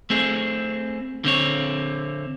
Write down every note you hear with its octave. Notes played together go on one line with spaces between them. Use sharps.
A3 C4 G#4
D3 C4 C#5